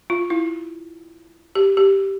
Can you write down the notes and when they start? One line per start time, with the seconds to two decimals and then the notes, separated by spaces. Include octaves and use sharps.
0.10 F4
0.30 E4
1.55 G4
1.77 G4